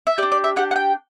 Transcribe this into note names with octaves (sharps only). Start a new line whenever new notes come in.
E5
D4 G4 D5
D5
E5
D4 G4 F#5
F#5
G5